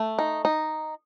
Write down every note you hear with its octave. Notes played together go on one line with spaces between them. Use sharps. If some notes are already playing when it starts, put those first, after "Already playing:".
Already playing: A3
D#4
D#4